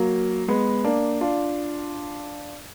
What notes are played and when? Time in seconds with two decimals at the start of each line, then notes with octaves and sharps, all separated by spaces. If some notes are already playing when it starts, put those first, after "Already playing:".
Already playing: F#3 A#3
0.48 G#3 B3
0.84 A#3 D4
1.21 D4 F4